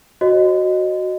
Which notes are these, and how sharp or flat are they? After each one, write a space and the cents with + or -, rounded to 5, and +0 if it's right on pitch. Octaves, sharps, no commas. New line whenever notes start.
F#4 +0 C5 +45 D#5 -15